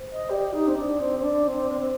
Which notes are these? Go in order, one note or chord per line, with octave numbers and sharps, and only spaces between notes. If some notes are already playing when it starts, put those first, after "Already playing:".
Already playing: C5
D#5
G4 D5
D#4
C4
D4
C4 D5
C4
D4
C4
C4 C5
C4